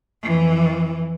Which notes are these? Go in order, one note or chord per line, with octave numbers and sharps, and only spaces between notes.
F2 E3